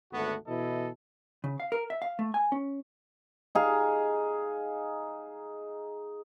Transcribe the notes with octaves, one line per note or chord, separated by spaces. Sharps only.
G#1 D2 A3 B3 F#4
B2 E3 E4 A4 D#5
C#3
F5
A#4
E5
F5
A3
G#5
C#4
D#4 G#4 F5